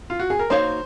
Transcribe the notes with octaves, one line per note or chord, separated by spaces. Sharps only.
F4
F#4
G#4
A#4
A#3 D#4 F#4 C5 C#5 F5